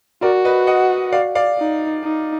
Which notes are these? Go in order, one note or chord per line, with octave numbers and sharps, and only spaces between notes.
F#4 A#4 D5
B4 D#5
D#5 F#5
D5 F5
D5 F5
D#4
D#4